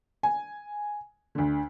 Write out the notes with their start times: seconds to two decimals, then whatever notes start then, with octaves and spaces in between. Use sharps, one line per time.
0.23 G#5
1.35 D2 D3